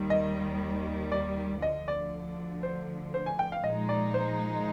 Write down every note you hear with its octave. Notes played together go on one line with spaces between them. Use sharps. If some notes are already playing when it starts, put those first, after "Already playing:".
Already playing: D#2 D#3 G3
D#5
D5
D2 D3 F3 D#5
D5
C5
C5
G#5
G5
F5
A#2 F3 G#3 D#4 D#5
D5
C5